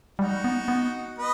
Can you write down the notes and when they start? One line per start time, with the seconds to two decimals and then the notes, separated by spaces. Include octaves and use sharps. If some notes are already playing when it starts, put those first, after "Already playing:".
0.19 G3 D#4 F#4
0.44 B3
0.68 B3
1.18 B4 D#5